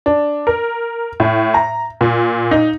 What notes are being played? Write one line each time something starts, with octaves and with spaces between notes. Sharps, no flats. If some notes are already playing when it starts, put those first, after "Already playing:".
D4
A#4
A2
A#5
A#2
D#4